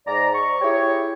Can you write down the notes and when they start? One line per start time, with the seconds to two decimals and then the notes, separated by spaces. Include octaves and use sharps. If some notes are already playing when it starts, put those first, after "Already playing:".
0.07 G#2 D5 A#5
0.34 C#6
0.61 E4 G4 G#4 C#5